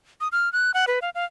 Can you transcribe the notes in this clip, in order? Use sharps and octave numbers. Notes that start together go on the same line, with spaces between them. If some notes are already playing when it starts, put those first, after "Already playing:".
D#6
F6
F#6
F#5
B4
F5
F5